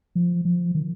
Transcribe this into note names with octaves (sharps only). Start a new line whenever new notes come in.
F3
F3
D#3